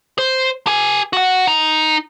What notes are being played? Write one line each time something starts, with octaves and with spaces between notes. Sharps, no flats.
C5
G4 G#5
F#4 F#5
D#4